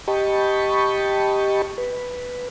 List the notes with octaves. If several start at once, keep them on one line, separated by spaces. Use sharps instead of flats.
G4 D#5 G5 A5 B5 C#6
B4